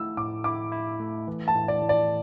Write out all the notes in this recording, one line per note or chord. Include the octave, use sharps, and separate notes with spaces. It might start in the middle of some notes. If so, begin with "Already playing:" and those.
Already playing: A3 E4 E6
A2 D6
E4 D6
E4
A3
E3
A5
A2
D5
A2
D5